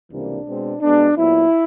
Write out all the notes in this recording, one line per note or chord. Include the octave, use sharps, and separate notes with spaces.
C#2 C3 E3 G3 A#3 D4
B2 G#3 C4
B2 G#3 B3 D4
A#2 F#3 B3 E4